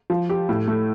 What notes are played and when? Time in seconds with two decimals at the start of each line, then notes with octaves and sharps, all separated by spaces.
0.10 F3
0.30 G4
0.49 A2
0.68 A3